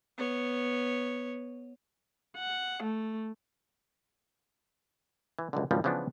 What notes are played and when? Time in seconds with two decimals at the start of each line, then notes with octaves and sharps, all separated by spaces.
0.18 B3 C#5
2.38 F#5
2.83 A3
5.39 E3
5.53 C#2 F#2 D3
5.71 G#1 C#2 F3 G3
5.84 C#3 E3 F3 B3 D4